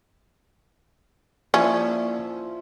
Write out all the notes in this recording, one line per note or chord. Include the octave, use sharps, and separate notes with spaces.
F3 A#3 C#4 E4 D5 E5